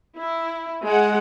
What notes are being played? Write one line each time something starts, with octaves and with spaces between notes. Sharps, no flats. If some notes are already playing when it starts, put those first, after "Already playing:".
E4
G#3 F#5